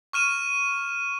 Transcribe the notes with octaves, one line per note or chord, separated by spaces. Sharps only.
C#6 F6 D#7 E7